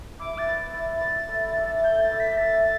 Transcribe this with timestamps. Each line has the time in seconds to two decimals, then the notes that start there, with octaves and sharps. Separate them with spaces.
0.19 E4 D6
0.38 A6
0.46 B4 D5
0.73 E4 A6
1.01 B4 D5
1.29 A3
1.56 D4 A4 E5
1.75 A6
1.83 A3 G6
2.01 A6
2.11 D4 A4 E5
2.20 B6
2.37 A3 A6